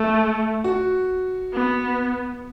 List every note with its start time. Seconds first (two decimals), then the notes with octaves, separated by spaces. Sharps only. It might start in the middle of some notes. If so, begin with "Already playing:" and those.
Already playing: A3 A4
0.64 F#4
1.53 B3